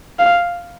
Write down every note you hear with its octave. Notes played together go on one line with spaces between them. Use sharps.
F5